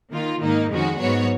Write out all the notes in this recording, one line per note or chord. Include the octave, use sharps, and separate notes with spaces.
D#3 A#3 F4
G#2 D#3 A#3 D#4
F2 D#3 G#3 C#4 F#4
G#2 F#3 B3 F#4 C#5